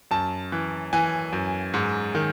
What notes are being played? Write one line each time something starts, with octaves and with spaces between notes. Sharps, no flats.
F#2 A5
E3
E3 G#5
F#2
G#2
D#3